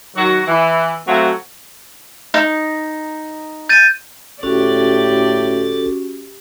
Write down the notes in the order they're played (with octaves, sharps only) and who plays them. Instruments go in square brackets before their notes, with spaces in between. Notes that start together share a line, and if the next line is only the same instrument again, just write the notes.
[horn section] D#3 F#3 F#4
E3
F#3 A3 C4 F4 F#4
[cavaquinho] D#4
[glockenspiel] G6 A6 D#7
[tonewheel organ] G1 A4 [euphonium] A2 [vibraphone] C#4 F#4 [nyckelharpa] G4 D5